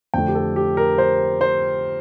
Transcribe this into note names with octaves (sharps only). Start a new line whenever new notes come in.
F2 D3 A3 G5
G4
A4
G4
A#4
C5
C5